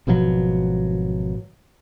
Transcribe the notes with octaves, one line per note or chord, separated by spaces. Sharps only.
G#1 B2 F3 F#3